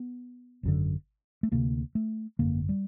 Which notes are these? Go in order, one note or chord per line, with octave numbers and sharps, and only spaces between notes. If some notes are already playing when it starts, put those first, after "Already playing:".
Already playing: B3
G#1 F#2 D3
A3
D2 C3 A#3
A3
G#1 F#2 D3 A#3
G3